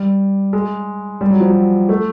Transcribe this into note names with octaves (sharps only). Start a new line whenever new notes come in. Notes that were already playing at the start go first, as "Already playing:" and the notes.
Already playing: G3
G#3
G3
F#3
F3
F#3
A3